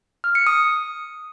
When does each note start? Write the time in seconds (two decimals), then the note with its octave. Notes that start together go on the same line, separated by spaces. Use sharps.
0.24 F6
0.35 C#7
0.47 D#6